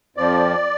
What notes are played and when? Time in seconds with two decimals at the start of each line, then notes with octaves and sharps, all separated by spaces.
0.17 F2 F3 D5